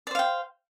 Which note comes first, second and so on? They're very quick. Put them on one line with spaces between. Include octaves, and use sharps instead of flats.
D5 C5 F5 G5